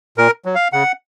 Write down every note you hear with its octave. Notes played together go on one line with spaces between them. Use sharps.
A#2 A#4
F#3
F5
C#3 F#5